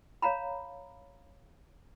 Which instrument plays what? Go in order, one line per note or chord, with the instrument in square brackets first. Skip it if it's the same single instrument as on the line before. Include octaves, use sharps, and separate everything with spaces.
[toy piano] C#5 F5 A#5 B5